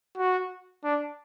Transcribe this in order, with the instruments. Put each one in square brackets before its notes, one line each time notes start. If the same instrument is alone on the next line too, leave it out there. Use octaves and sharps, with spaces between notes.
[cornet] F#4
D4